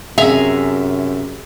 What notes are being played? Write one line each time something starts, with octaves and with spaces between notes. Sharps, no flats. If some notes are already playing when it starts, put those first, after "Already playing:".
F#2 C3 G#4 E5 G#5 A#5